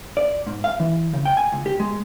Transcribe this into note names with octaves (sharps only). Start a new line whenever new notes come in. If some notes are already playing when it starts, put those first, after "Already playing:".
D5
G#2
F5
E3
C#3
G5
G#5
C#2
G4
G#3